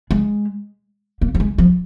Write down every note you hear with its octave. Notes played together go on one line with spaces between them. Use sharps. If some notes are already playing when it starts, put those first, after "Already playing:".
G#3
A#3
G3
G#3
F3